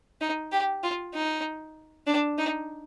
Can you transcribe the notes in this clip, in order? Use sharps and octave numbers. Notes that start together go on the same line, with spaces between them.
D#4
G4
F4
D#4
D4
D#4